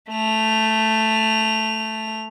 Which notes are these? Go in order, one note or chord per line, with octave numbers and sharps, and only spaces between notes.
A3 F7